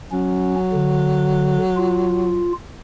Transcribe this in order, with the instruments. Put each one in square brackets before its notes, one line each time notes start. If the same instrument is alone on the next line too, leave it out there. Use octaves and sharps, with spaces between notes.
[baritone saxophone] F#3 [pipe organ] C#4
[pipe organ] D3
F4